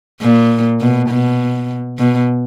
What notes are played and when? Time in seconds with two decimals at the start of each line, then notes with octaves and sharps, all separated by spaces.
0.22 A#2
0.81 B2
1.09 B2
1.99 B2